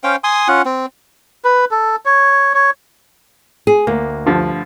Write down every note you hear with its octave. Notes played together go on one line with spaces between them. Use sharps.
C#4 C5 F5 G5
G#5 C6 D#6
C#4 F4 F#5
C4
B4
A4
C#5
C#5
G#4
D2 A#3
G2 D3 F3